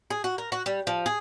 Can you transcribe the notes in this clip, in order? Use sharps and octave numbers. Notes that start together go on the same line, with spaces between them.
G#4
F#4
A#4
F#4
G3
F3
G#4